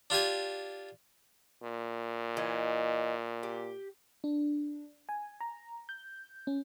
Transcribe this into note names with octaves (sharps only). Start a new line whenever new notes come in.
D4 F4 G4 G#5
A#2
E3 D#5
G4
D4
G#5
A#5
G6
C#4